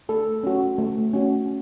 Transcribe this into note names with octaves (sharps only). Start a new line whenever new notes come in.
A3 A4
C#4 F#4
A3
C#4 F#4